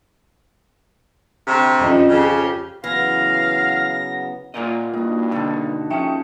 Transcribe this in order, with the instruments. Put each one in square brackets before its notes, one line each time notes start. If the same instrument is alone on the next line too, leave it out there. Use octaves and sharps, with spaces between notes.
[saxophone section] D2 C3
[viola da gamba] F2 D#3 C#4
[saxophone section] F2 C#3 [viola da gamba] F3 G4
[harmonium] C#3 F#3 B3 [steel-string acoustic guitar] E3 [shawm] F5 [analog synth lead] A#6
[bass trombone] A#2 [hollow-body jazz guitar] F4 A#4 D#5
[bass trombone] G2 [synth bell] A#3 [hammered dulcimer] D#4 F#4
[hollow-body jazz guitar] B2 D3 [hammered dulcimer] D#3 A4
[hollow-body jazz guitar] F3 C#4 [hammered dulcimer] G#4 [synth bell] E5 G5 C#7